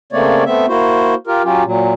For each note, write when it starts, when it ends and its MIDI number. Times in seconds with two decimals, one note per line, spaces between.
0.13 0.44 49
0.13 0.44 57
0.13 0.44 58
0.13 0.44 60
0.13 0.44 73
0.13 0.44 74
0.46 0.66 57
0.46 0.66 59
0.46 0.66 60
0.46 0.66 76
0.68 1.14 58
0.68 1.14 64
0.68 1.14 66
0.68 1.14 72
1.27 1.42 65
1.27 1.42 67
1.27 1.42 70
1.44 1.64 54
1.44 1.64 61
1.44 1.64 65
1.44 1.64 67
1.65 1.93 46
1.65 1.93 54